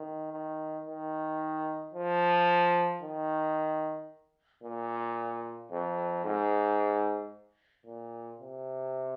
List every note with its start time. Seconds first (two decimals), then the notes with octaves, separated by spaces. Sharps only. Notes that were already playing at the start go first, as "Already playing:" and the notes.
Already playing: D#3
0.32 D#3
0.86 D#3
1.94 F3
3.02 D#3
4.63 A#2
5.71 F2
6.25 G#2
7.86 A#2
8.41 C3